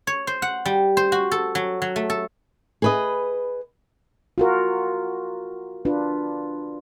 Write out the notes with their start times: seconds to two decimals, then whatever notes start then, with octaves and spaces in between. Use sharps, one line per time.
0.07 C#5
0.27 C5
0.42 F#5
0.66 G3
0.97 C5
1.12 F#4
1.32 A4
1.55 F#3
1.82 F#3
1.96 A3
2.10 A4
2.82 G#4 B4 D#5
4.38 F4 F#4 A#4
5.85 D4 F4 B4